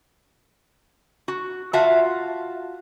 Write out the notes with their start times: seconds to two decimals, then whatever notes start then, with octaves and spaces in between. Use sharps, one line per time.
1.28 F#4
1.73 F4 F#4 E5 F5 A5